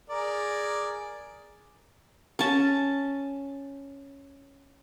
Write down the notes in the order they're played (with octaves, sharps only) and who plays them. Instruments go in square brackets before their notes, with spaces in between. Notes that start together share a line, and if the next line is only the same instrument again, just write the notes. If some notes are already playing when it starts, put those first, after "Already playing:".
[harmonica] G#4 A#4 D5
[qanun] C#4 A5